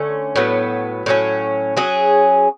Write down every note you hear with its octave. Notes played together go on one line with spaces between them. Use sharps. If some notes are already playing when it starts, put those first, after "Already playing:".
Already playing: D3 A3 C#4
A2 F#3 B3
A2 F#3 A3 C#4
F#3 C#4 G#4